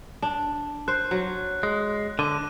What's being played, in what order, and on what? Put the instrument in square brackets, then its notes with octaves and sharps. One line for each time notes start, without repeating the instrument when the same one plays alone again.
[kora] D4
[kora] C5 [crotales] F#6
[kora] F#3
[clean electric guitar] G#3
[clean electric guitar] D3 [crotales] D6 D#7